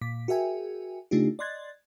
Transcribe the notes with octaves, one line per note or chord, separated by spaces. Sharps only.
A#2 D6 B6
F#4 G#4 A#4 E5 G5 G#5
C#3 A3 D4 D#4 F4 G4
D5 D#5 C6 F#6 G#6 A6